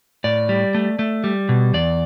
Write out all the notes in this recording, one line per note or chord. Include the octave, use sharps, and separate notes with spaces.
A2 D5
G3
A3
A3
G3
B2
E2 D5